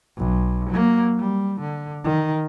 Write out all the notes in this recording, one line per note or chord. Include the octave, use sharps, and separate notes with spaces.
B1
F#3 A#3
G3
D3
D#3